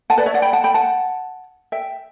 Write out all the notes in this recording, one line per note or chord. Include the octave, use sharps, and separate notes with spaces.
F#5 A5
B4 D5
C#5 E5
D5 F#5
G5 B5
F#5 A5
G5 B5
F#5 A5
E5 G5